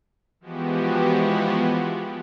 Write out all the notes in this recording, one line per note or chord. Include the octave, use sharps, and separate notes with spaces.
E3 F3 G#3 B3 F#4 G4